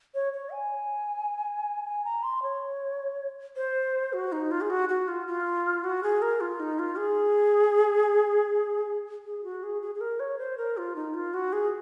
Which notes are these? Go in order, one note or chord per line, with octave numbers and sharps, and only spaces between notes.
C#5
C#5
G#5
G#5
A#5
C6
C#5
C5
F#4
D#4
F4
G#4
F#4
F#4
F4
F4
F#4
G#4
A#4
F4
D#4
F4
G#4
G#4
F#4
G#4
G#4
G#4
A#4
C#5
C5
A#4
F4
D#4
F4
F#4
G#4